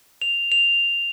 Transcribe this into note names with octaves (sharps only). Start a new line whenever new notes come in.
F7
F7